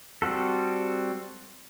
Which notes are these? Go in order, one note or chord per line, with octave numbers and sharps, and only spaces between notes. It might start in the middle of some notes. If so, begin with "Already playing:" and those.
G3 C4 F#4 A4